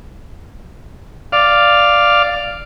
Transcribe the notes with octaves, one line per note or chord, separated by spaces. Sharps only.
D5 F5